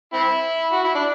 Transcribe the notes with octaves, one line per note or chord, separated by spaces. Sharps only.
C4 E4
F#4
E4
D4